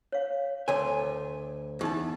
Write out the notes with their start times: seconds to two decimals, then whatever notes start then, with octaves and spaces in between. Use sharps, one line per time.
0.12 C#5 F5
0.68 D2 A#4 C#5 G#5 C6
1.81 E2 D#4 G4 A5